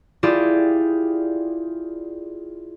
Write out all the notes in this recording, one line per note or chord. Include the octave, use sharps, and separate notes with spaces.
E4 F4 G4 G#4 D5